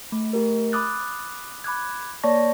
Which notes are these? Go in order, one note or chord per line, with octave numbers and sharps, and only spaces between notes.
A3
A3 G4 A#4
B5 D6 D#6 F#6 A6
B5 D6 F#6 G#6
A#3 C#5 D5 A5 C#6 A#6